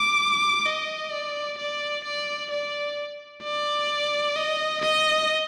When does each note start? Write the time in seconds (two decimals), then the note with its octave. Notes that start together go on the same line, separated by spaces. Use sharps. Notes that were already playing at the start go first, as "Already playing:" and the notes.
Already playing: D6
0.66 D#5
1.12 D5
1.58 D5
2.05 D5
2.51 D5
3.44 D5
4.36 D#5
4.82 D#5